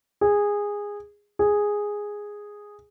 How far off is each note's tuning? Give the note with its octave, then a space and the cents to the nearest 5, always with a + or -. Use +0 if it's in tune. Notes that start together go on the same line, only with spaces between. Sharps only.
G#4 -15
G#4 -5